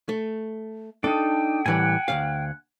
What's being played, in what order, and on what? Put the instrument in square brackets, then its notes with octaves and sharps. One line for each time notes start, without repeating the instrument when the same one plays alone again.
[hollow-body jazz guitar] A3
[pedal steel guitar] D4 D#4 [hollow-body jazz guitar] A4 [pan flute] G5
[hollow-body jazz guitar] A2 E3 G3 [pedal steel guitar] F#5 G#5
[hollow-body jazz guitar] D2 A#2 F5